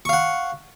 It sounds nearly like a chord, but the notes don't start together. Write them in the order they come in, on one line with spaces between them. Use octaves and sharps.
C#6 F5 F#5